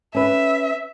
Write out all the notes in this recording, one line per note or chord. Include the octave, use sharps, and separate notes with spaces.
C#4 B4 E5